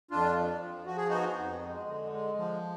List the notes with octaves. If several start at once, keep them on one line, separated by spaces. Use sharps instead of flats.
F2 D4 F4
F3
F3
F3 F#4
G#4
B3 D#4 F#4
F2
G#3
D3
G#3
F3